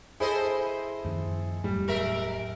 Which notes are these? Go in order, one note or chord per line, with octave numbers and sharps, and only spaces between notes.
E4 G#4 A4 C5 D#5
F#2 D#3 F3
E1 A2 F#3 G3
G#3 A#4 E5